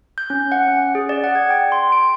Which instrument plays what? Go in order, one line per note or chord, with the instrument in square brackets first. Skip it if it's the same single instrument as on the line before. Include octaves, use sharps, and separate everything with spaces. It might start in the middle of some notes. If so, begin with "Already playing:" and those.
[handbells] G6
C#4
F#5
C#4
G#4
D5
F#5
G#6
G5
C6
D7